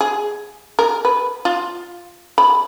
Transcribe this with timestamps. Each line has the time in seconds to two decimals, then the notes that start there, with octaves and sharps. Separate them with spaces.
0.01 G#4
0.79 A#4
1.05 B4
1.45 F4
2.38 B5